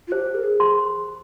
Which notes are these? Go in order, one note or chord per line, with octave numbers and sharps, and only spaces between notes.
F4
G4 C5
A#4
G#4
C6